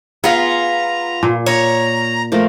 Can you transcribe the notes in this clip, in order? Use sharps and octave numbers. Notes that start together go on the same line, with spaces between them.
B3 F4 G#4 A#5
A#2
C#5 A#5
F3 A3 A#4